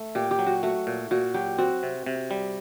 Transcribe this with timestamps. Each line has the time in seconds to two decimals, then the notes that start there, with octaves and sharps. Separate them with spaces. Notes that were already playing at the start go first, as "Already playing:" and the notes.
Already playing: A3
0.15 A#2 G4
0.31 G4
0.39 F#3
0.46 F#4
0.63 A3 F#4
0.87 A#2
1.11 A#2 F#4
1.34 F#3 G4
1.58 C4 F#4
1.83 C3
2.06 C3
2.31 G3